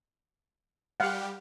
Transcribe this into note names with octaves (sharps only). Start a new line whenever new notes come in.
G3 G4 F5 F#5